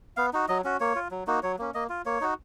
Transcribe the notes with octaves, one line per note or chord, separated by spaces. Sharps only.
B3 F5
D#4 F#4
F#3 D#5
C#4 F#4
A#3 C#5
F4
F#3
A#3 D#4 F#4
F#3 C#5
A#3 C#4
A#3 D#5
F4
A#3 C#5
D#4 F#4